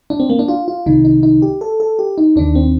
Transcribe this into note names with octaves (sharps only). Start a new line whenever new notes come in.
D4
C4
A#3
D4
F4
F4
C2 C3 D#3 D#4
D#4
D#4
G4
A4
A4
G4
D#4
D#2 D#3 D4
C4